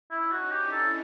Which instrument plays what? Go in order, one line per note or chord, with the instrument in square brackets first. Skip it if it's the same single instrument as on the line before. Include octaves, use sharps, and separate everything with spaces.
[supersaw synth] C#4 D#4 [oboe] E4
[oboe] F#4
[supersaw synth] D4 E4 [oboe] G4
[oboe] A4